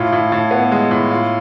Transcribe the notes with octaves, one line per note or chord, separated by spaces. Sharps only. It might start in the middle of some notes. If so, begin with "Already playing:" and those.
Already playing: A2 F4
A2
A2
B3
G#3
A2
F4